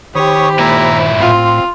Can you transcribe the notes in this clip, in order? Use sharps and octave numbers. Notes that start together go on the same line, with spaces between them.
D#3 G4 C5 C#5 B5 C#6 D#6
A#2 E4 E5 A#5
A2 C4 F4